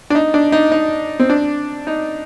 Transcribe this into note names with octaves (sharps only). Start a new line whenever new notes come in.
D4
D#4
D4
D#4
D#4
C4
D4
D#4